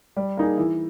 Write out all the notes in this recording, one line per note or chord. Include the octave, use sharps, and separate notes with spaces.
G3
A#3 D#4 G#4
E3